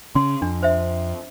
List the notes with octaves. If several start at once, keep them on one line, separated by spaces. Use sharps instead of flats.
C#3 C#4 C6
F2 D4
C5 E5